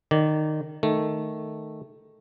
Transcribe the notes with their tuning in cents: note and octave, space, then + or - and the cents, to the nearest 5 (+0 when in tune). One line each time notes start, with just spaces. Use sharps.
D#3 -15 D5 -15
D#3 +0 A3 +0